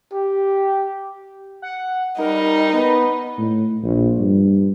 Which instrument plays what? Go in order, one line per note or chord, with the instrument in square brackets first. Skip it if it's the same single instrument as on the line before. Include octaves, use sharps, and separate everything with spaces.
[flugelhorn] G4
[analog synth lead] F#5
[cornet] G3 [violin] D#4 [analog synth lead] A#4
[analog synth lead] B3 [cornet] B4
[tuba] A2
A#1
G2